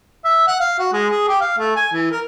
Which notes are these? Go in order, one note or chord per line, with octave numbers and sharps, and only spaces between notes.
E5
F#5
F5
F#4
G#3
G#4
G4
F5
A3
G#5
E3
A#4